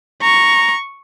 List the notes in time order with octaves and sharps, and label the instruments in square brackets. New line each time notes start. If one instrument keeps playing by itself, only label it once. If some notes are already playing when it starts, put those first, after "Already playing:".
[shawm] A#5 [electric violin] C#6